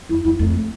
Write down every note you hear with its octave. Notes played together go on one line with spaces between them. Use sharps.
F2 E4
F2 E4
F2 A3
A3